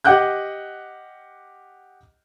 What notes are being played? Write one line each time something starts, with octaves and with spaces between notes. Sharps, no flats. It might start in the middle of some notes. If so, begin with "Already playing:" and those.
G4 D#5 F#5 D6 F#6 G6